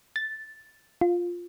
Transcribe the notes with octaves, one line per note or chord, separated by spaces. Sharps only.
A6
F4